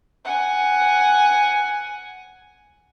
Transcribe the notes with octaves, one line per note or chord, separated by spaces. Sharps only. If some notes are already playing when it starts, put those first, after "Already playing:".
F#5 G#5